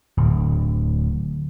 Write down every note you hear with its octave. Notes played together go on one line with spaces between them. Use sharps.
D1